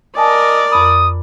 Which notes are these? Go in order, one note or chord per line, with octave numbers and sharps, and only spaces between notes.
A#4 D5 D#5 G#5 A5
F2 B5 D#6